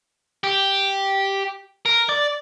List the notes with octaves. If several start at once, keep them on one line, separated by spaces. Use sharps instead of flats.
G4
A#4
D5